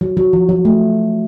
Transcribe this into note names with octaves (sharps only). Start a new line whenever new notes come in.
F#3
F#3
F3
F#3
A3